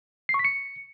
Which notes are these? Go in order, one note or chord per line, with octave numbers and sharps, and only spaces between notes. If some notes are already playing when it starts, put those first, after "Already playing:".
C7
C#6
B6
C#7